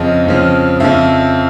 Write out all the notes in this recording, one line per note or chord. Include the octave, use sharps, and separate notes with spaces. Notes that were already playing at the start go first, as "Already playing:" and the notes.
Already playing: F2 C#3 F3 D#5
F2 C#3 F3
F2 C#3 F3 E5